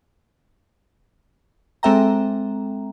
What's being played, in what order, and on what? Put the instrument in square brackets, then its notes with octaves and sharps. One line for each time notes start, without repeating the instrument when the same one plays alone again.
[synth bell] G#3 C4 A4 E5 G5 A#5